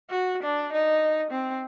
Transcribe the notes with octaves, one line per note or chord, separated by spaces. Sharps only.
F#4
D4
D#4
C4